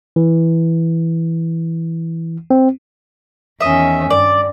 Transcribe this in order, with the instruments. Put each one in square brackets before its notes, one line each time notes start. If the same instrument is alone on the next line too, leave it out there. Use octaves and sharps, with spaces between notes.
[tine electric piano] E3
C4
[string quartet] E2 D#3 C#4 [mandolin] D#5 E5
[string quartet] G2 [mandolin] D5